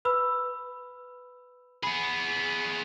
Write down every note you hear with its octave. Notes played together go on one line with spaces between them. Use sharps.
B4 B5 E6
B3 G#4 B5